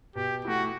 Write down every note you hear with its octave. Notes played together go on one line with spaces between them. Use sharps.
B2 G4
A3 E4 F#4